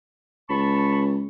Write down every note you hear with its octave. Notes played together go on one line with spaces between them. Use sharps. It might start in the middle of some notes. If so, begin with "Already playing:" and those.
C#2 A5 B5 C#6